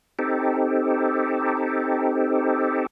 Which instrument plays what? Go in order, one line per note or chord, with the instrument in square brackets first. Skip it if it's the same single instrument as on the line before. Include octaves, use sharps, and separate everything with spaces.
[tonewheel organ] C4 D#4 G4 A4